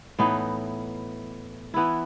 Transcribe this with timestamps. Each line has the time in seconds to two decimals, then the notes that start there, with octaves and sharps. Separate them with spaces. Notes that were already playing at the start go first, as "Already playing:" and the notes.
0.19 A2 E3 B3 D#4
1.74 E3 B3 E4